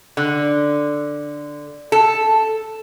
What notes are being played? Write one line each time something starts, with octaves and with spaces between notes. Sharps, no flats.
D3
A4